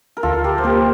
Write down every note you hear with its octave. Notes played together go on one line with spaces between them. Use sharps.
A#4
D2 F4 A4
G4 A#4
C5
A#3 G4 A#4